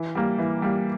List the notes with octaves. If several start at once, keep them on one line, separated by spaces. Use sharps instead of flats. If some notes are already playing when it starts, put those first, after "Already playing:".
Already playing: E3
G3 A#3
E3
G3 A#3